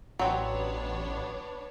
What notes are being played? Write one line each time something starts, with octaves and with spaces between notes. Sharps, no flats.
A1 F#3 B3 C4 D4 C#5